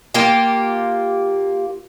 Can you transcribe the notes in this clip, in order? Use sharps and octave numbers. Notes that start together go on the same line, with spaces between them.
A#3 F4 G4